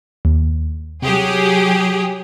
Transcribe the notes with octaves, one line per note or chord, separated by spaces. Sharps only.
D#2
C3 F#3 G4 G#4